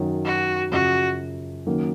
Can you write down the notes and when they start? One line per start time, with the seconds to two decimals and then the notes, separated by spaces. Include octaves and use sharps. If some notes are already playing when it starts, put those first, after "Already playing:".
Already playing: F#2 D#3 F#3
0.25 F#4
0.71 F#2 C#3 F3 F#4
1.66 D#3 F#3 A#3 C#4